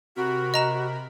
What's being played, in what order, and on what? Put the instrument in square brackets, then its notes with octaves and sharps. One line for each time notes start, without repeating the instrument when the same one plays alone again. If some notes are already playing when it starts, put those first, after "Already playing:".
[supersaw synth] C3 A#4 B5 [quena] F#4
[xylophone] D#5 A#5 E7